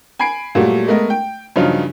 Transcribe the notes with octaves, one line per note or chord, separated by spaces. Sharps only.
G#5 B5 G#6 C7 D7
A#2 F#3 G3 A3 F#4
G#3 A3 B3 A#4 D#5
G5
G2 C#3 F3 F#3 D#4 F4